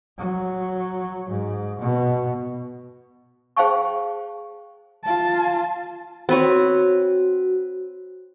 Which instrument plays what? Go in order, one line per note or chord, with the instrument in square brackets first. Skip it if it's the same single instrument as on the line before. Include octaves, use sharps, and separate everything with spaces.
[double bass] F#3
G#2
B2
[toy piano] G#4 C5 F5 G5 A5 C#6
[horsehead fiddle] F4 A5
[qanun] C4 B4 C#5 [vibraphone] F#4